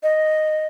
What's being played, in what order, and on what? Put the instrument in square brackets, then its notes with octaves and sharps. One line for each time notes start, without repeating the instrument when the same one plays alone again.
[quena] D#5